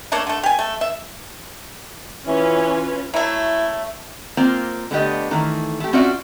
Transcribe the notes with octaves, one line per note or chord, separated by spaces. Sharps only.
A3 A#3 D4 C#5
D3 A3
G4 G#5
A3
E5
E3 C#4 F4 B4
F#3 A3 E4
A#3 C4 F4
D3 A3 B3 G4 D#5
D#3 E3 A3
A3 G4
C4 C#4 F4 F#4 D5 E5